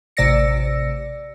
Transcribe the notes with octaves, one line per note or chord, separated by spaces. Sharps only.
A1 C3 D5 E6 A#6 C#7